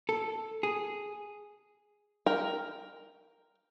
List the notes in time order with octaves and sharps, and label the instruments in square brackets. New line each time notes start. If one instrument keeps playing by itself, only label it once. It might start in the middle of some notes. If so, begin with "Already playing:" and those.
[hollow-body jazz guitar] A4
G#4
[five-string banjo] A#4 G5